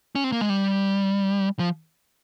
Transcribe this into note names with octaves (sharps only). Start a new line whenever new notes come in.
C#4
C4
A#3
G#3
G3
F3